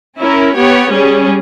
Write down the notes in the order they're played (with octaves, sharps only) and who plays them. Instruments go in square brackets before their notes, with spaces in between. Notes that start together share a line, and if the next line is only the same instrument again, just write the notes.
[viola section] C#4 E4 A#4
B3 G4 C#5
G3 C#4 G#4